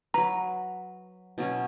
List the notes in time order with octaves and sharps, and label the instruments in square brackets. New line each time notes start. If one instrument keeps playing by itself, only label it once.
[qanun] F#3 B4 [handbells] A#5
[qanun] B2 F#3 C#4